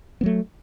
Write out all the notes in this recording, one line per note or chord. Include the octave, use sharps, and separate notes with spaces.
F#3 A3 B3